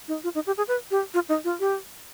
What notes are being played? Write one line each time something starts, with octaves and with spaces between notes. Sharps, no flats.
D#4
F4
D#4
G4
G#4
B4
G4
F4
D#4
F4
G4